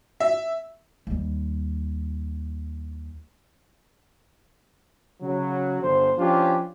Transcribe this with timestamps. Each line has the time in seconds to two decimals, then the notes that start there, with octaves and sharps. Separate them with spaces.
0.20 E5
1.07 D#2 G3
5.21 C#3 F#3
5.81 G1 C5
6.18 F3 C#4 D4 F4 G4